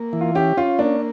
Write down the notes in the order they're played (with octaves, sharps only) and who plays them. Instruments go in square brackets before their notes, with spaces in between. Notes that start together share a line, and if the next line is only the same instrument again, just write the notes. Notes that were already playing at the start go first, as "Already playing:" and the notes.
Already playing: [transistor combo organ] A#3
E3
[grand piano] F4
[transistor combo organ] C#4 [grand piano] G4
[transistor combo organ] C#4 [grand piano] F4
[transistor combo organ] A#3 [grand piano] D4